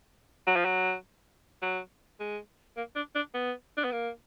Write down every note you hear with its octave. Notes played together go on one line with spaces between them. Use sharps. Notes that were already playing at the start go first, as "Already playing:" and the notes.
F#3
F3
F#3
F#3
G#3
A#3
D4
D4
B3
D4
B3
A#3